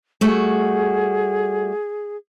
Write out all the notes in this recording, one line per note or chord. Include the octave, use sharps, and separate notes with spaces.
G3 A3 F#4 G#4